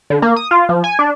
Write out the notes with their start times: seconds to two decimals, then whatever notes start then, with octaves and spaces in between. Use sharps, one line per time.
0.10 D3
0.22 A#3
0.36 D#6
0.51 F4
0.69 F3
0.84 G#5
0.99 D4